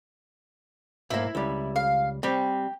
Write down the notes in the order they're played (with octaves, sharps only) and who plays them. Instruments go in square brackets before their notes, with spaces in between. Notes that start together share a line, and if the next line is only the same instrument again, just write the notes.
[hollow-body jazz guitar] B1 G#2 A#3 [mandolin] E4
[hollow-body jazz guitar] C#2 G3
[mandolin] F5
[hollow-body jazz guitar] G3 C4 [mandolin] G4